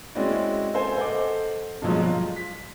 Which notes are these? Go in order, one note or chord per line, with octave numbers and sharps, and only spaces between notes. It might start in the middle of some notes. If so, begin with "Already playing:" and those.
G#3 C4 C#4 E4 F#4 D5
A4 C5 G#5
A4 C5 D#5 F#5 D6
G2 B2 D3 F3 F#3 G#3
F4
B6